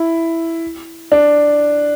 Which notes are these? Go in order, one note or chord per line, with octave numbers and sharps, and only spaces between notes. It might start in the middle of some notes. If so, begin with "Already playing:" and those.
Already playing: E4
D4